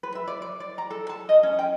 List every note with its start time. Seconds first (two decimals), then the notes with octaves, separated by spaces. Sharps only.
0.03 B4
0.15 E5
0.27 D5
0.42 D5
0.60 D5
0.78 A#5
0.90 A4
1.09 A5
1.29 D#5
1.43 C#4
1.59 G5